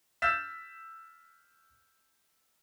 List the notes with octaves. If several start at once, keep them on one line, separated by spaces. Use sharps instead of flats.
E6 F6 G6 A6 B6 E7